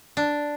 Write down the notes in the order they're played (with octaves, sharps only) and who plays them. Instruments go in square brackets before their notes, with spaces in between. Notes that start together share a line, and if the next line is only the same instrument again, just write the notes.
[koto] D4